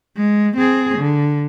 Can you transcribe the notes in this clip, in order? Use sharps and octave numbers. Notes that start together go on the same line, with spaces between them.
G#3
C4 G#4
D3